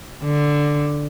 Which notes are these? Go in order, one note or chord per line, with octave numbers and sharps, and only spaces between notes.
D3